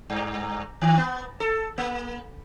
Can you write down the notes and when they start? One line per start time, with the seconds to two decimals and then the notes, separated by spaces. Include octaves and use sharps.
0.10 G2
0.82 D#3
0.97 B3
1.40 A4
1.78 A#3